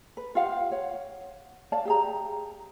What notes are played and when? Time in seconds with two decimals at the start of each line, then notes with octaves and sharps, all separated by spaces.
0.17 B4
0.35 F4 G4 F5 F#5
0.72 C#5 F#5
1.72 C#5 D5 F5 A5
1.85 G4 G#4 A#5